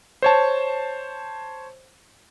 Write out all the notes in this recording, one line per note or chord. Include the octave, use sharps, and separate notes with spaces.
C5 C#5 A5